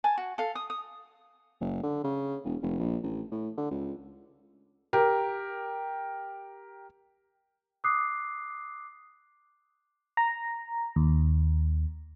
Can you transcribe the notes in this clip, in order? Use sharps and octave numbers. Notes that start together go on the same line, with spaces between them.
G#5 A5
F#4
A4 F5
D#6
D#6
F#1
D3
C#3
E1
F1
A#1
A1
A2
D3
C#2
G4 A#4
D6 D#6 F#6 C7
A#5
D#2